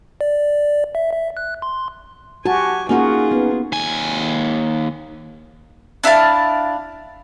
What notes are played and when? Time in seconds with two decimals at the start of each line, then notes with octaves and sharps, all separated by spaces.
0.21 D5
0.95 E5
1.13 E5
1.37 F#6
1.62 C6
2.45 F#4 G4 G#5 A5
2.89 A#3 C#4 D#4 F4 F#4 G#4
3.31 B3
3.72 D#2 G#5
6.04 D4 E4 F5 A5